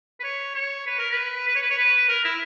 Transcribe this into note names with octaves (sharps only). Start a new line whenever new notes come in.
B4
C#5
C#5
B4
A#4
B4
B4
C#5
B4
C#5
B4
A#4
E4